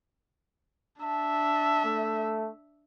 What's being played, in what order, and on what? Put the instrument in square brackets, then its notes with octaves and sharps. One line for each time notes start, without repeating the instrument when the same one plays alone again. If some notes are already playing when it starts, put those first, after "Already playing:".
[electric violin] D4 E5 [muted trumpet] A5
[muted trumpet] A3